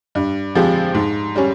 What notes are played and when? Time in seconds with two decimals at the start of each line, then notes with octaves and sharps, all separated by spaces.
0.15 G2
0.55 F3 G#3 C4 G4
0.95 G#2
1.35 G3 C#4